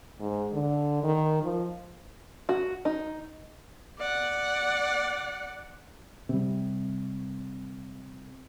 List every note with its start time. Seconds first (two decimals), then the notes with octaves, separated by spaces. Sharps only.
0.20 G#2
0.53 D3
1.03 D#3
1.43 F3
2.49 F#4
2.85 D#4
3.99 D5 F#5
6.29 C3 G3